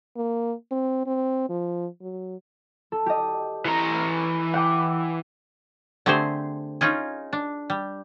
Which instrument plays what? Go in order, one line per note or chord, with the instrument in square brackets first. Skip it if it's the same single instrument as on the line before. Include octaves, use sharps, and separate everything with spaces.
[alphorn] A#3
C4
C4
F3
F#3
[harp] A4
G4 D#5
[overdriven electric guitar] E3 A#5
[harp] F#5 G5 D6
[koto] D3 A3 C4 G4 G#4 C5
C#4 D#4 F4 G#4
D4
G3